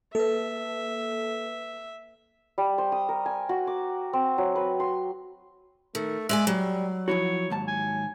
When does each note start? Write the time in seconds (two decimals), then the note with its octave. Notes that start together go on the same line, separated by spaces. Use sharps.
0.15 A#3 A4 B4 E5
2.58 G3
2.78 C5
2.92 D#6
3.09 A#4
3.26 G#5
3.49 F#4
3.67 D6
4.13 C4
4.38 F#3
4.56 B4
4.80 C6
5.95 D#3 A3
6.29 G#3 D5 E5 G#5
6.47 F#3 G3
7.08 F3 E4 F#4 C#5
7.50 D#2 G#2 A5
7.68 G#5